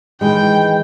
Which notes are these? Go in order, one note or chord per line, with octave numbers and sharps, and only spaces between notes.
D#3 E3 G#3 G5